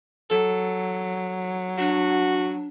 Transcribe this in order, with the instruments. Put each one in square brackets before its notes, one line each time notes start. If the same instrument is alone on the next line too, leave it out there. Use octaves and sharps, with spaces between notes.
[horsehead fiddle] F#3 [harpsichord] A4
[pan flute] D4 [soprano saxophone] F#4